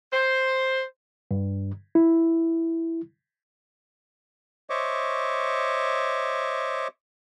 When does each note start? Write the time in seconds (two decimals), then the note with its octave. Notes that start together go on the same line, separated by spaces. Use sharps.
0.13 C5
1.31 G2
1.95 E4
4.70 C5 C#5 D#5 E5 C#6 D6